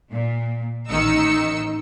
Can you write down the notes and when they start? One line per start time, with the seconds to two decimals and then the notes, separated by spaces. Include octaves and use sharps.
0.11 A#2
0.89 A1 D#3 D#4 E6 C#7